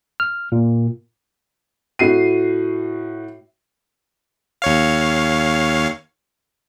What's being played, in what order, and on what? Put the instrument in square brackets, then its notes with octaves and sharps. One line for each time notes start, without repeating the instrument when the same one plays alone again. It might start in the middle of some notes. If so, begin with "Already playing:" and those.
[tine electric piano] F6
A#2
[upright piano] A2 F#4 C7 D#7
[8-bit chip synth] D#2 C#5 F5